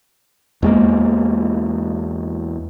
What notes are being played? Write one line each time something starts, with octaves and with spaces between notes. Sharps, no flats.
E2 G#3 A#3